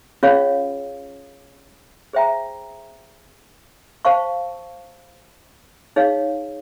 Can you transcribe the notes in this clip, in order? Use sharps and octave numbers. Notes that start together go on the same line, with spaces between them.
C#4 F4 G#4 C#5 F5
G#4 C5 E5 G5 A#5
C5 F5 A5 C#6
D#4 G#4 C#5 F5